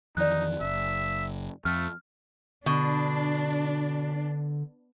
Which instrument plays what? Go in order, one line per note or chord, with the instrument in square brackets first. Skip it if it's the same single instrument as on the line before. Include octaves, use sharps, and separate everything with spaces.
[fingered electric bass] F2 D#3 E3 [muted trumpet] D#4 [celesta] D5 F#6
[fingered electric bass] F#1 [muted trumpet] E5
[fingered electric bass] F2 [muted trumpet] A3 [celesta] F6
[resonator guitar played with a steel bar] B2 [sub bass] D3 [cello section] D4